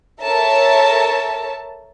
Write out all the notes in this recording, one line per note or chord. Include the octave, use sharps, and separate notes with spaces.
A4 A#4 C#5 E5 A5